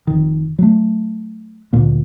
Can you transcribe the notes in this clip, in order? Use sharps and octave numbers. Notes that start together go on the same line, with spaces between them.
F1 D#3
F#3 A3
D2 A#2 A#3